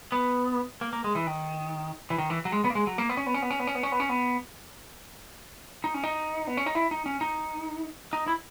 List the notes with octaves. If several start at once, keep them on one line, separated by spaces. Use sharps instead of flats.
B3
A#3
A#3
G#3
E3
D#3
E3
D#3
E3
F#3
G#3
B3
A#3
G#3
F#3
A#3
B3
C#4
B3
C#4
B3
C#4
B3
C#4
B3
C#4
B3
C#4
B3
D#4
C#4
D#4
B3
C#4
D#4
E4
D#4
C#4
D#4
D#4
E4